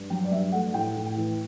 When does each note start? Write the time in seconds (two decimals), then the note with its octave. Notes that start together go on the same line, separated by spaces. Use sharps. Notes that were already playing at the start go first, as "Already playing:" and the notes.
Already playing: G2
0.10 F#3 G5
0.24 D5
0.31 G2 E5
0.52 A3 F#5
0.74 A2 G5
0.96 A2
1.06 G5
1.17 E3